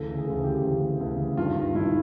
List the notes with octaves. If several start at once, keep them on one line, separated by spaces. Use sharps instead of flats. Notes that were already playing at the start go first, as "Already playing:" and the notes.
Already playing: D2 C#3 E3 A4
G#4
D2 C#3 E3 A4
G4
D2 C#3 E3
D2 C#3 E3
G2 D#3 F4
G2 D#3 E4